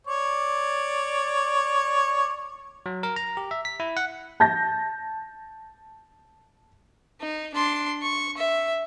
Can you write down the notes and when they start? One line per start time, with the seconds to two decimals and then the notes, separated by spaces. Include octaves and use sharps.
0.07 C#5 D5
2.86 F#3
3.03 A#4
3.16 A#5
3.37 G4
3.51 E5
3.65 B6
3.80 E4
3.97 F#5
4.40 A5 G6 A#6
7.21 D#4
7.54 D4 C6
8.02 C#6
8.37 E5